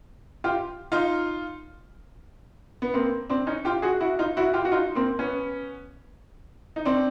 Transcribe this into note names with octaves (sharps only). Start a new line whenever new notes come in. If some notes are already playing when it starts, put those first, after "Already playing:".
F4 G4
D#4 F4
B3
A#3 C4
C4 D4
C#4 D#4
F4 G4
F#4 G#4
E4 F#4
D#4 F4
E4 F#4
F4 G4
F#4
D#4 F4
A#3 C4
B3 C#4
D#4
C4 D4